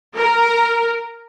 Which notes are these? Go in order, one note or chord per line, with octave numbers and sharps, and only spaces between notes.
A#4